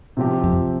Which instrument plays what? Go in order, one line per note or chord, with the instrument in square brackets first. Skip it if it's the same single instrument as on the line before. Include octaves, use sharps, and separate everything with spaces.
[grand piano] C3 F3 C4 G4
[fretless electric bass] F2